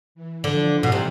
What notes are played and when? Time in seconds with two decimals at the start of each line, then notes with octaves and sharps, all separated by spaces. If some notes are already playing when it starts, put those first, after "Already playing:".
0.15 E3
0.44 D3 F3
0.72 E3
0.83 B2
0.92 C3